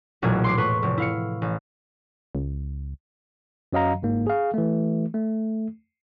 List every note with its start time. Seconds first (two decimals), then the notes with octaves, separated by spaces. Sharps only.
0.22 E1 B1 A#2 A3 G#6
0.44 C6 D6 C7
0.57 A2 B4 C6 C#6
0.83 F1
0.98 E4 F5 C#7
1.42 A1
2.35 C#2
3.73 F#2 F#3 D#5 F5 A#5
4.02 G1 G#2 A#3
4.27 G#4 F5
4.54 E3 A3
5.14 A3